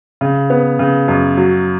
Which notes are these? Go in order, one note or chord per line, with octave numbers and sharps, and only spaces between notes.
C#3
B3
C#3
F#2
F#3